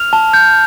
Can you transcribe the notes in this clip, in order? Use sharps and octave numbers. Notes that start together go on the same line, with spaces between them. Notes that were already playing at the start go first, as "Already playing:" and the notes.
Already playing: F6 F7
A5
G6